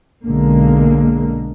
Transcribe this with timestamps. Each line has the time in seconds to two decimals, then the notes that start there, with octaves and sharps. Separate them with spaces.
0.25 B1 D3 G#3 A#3